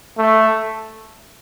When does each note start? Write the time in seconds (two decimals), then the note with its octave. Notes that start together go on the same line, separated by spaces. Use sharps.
0.18 A3